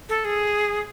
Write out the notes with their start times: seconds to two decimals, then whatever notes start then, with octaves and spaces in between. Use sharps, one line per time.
0.09 A4
0.25 G#4